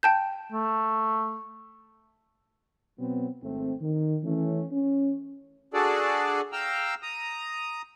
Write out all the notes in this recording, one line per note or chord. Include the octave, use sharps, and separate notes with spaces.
G5 A5 G6
A3
B2 F#3 B3 C4
G#1 A3 C4
D#3
E3 A3 C#4
C#4
D4 F#4 G#4 A4 D5
F5 G5 A#5 E6
A#5 D#6